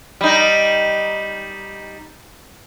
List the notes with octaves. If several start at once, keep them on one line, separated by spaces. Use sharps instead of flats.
G3 D#4